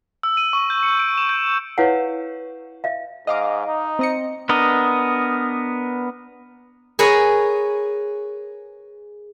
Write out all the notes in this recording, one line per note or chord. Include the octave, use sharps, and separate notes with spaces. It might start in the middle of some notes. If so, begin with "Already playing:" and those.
E6
D#7
C#6
G6
C#7
D7
E7
G6
E4 B4 C#5 F5 F#5
E5 F5
G#2 D#5 F5 D6
D#4
C4 D#5 C#7
B3 D4 A#4 D#5
G#4 A#4 B4 C#5 G#5